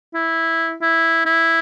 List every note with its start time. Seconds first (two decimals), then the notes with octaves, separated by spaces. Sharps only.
0.14 E4
0.82 E4
1.26 E4